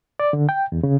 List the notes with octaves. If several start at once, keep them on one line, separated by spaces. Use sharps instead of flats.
D5
D3
G5
E2
C#3